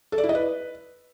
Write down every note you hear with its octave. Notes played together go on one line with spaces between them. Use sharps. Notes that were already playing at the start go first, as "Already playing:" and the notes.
A4
D5
E4
D#5
B4